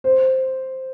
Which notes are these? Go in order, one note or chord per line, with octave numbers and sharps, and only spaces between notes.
C5